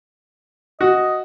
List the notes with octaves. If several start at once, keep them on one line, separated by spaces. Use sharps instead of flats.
F#4 D#5